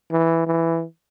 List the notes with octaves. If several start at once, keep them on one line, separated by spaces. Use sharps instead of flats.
E3
E3